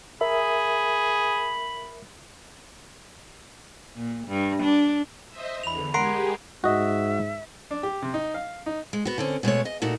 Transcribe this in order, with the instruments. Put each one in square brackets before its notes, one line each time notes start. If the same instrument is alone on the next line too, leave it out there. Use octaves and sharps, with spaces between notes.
[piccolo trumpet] G#4 [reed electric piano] A#4 E5 [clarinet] B5
[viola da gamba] A#2
G2
D4
[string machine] C5 D#5 E5
[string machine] E2 D3 [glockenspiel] B5 F7
[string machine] G#3 G4 G#4 [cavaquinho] A#4 F#5 C6 [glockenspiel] C7 D7
[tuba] G#2 [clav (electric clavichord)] F#4 D#5 [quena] E5
[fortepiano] D4
G4
C3
D#4
F5
D#4
[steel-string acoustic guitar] G#3
B3 F#4
D3 C4 C#4
B2 G#3 A3 C#5
D#5
A#2 A3 D#4 F#4